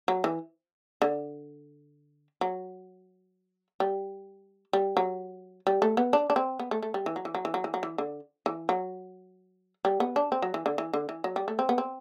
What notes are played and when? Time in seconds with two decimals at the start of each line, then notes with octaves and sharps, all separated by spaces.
0.08 F#3
0.24 E3
1.02 D3
2.41 F#3
3.80 G3
4.73 G3
4.97 F#3
5.67 G3
5.82 A3
5.97 B3
6.13 D4
6.30 D4
6.36 C4
6.59 B3
6.71 A3
6.83 A3
6.94 G3
7.06 E3
7.16 F#3
7.25 E3
7.35 F#3
7.45 E3
7.54 F#3
7.64 E3
7.74 F#3
7.83 E3
7.98 D3
8.46 E3
8.69 F#3
9.85 G3
10.00 B3
10.16 D4
10.32 C4
10.42 F#3
10.54 E3
10.66 D3
10.78 E3
10.93 D3
11.09 E3
11.24 F#3
11.36 G3
11.48 A3
11.59 C4
11.69 B3
11.78 C4